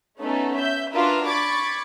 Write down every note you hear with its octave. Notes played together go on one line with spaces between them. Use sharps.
A3 B3 C#4 D#4 A4
E5 G6
D4 F4 F#4 A#4 B4 E5
B5 C#6 D6 G#6 A6